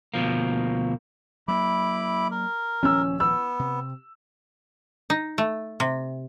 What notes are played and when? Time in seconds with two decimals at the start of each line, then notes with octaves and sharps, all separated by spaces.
0.14 D2 B2 F3 A#3
1.48 F#3 A#3 E4 B5 D6
2.31 A#4
2.83 D#1 F3 C#4 E6
3.20 B3 E6
3.59 C3
5.10 D#4
5.38 A3
5.80 C3